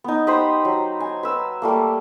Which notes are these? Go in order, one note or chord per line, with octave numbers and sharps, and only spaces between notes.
B3 D#4
G4 C5 B5 D#6
F#3
G#5
B4 E6
G3 A3 A#3